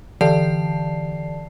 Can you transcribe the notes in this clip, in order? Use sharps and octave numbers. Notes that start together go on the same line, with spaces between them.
D3 E3 D5 A5 C7